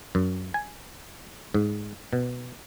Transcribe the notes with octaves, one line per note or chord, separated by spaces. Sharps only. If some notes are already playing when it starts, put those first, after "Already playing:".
F#2
G#5
G#2
B2